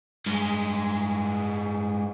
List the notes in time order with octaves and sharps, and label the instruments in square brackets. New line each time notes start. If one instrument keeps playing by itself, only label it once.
[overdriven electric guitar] G2 G#3